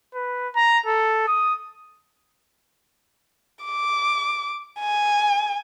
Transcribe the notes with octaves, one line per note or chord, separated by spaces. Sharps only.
B4
A#5
A4
D#6
D6
G#5